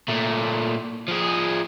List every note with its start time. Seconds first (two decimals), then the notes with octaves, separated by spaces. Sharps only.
0.08 A#2 A3
1.08 F3 G#4